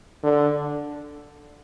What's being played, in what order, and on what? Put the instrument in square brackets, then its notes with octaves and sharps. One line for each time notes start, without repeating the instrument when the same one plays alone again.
[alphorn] D3